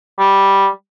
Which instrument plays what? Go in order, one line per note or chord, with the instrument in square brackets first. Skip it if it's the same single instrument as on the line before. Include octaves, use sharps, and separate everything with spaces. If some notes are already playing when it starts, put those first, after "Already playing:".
[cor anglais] G3